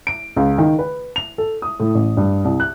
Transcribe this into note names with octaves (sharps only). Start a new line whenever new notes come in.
D7
C#2
D#3
B4
F7
A4
D#6
A2
A1
G2
C2
F#6